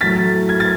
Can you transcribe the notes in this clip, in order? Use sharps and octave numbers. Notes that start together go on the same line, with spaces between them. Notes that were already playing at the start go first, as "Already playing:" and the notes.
A2 F#3 A3 A6 B6
G#6
A6